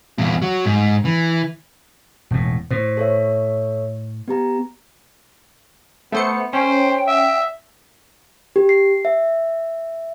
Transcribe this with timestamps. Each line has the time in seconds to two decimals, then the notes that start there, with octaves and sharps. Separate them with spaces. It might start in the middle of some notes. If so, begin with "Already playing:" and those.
0.18 E2 A#2
0.42 F#3
0.65 G#2
1.05 E3
2.31 E1 A2
2.71 A2 C5
2.97 A4 C#5 E5
4.28 B3 G4 A#5
6.12 A3 B3 C5 C#7
6.53 C#4 C5 G5
7.08 E5
8.56 G4
8.69 C7
9.05 E5